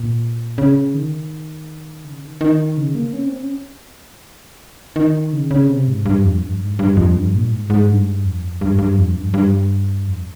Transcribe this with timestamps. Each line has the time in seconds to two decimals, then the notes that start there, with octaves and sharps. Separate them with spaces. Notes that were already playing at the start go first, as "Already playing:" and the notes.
Already playing: A#2
0.58 C#3
0.94 D#3
2.05 C#3
2.22 D#3
2.41 D#3
2.77 C#3
2.95 A#3
3.13 C#4
3.25 C4
3.38 C#4
4.96 D#3
5.33 C#3
5.51 C#3
5.69 C3
5.88 G#2
6.06 G2
6.24 F2
6.41 G2
6.61 G#2
6.79 G2
6.97 F2
7.15 G2
7.33 A#2
7.51 G#2
7.70 G#2
7.88 G2
8.24 F2
8.61 G2
8.79 G2
8.98 F2
9.15 G2
9.34 G2
10.07 F2